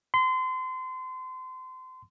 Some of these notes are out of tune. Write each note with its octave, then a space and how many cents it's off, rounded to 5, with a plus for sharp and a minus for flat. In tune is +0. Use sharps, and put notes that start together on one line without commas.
C6 -30